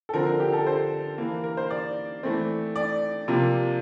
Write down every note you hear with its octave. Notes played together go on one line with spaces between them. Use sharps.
A4
D3 F3 C4 A#4
A#4
G4
A4
C5
E3 A#3
A#4
C5
D5
E3 A3 C4
D5
C3 F3 A#3